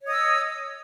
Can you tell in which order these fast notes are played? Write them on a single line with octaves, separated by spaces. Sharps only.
C#5 D#5 D#6 E6